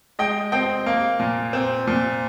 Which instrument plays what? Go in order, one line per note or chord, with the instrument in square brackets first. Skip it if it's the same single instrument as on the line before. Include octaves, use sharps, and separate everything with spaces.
[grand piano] G#3 D#5 G5
C4 D#5 G5
A#3
A#2
C4
A#2